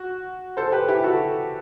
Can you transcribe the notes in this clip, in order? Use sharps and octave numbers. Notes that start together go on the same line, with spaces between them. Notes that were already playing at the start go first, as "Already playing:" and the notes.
Already playing: F#4
A4 C5
G4 B4
E4 G4
F#4 A4